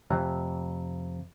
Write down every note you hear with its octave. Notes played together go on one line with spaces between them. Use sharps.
F2 C3